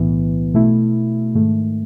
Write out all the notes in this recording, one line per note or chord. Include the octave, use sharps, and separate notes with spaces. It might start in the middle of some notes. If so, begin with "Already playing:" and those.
Already playing: B1 A2 E3 B3
B2 A3 E4
G#2 D#3 A3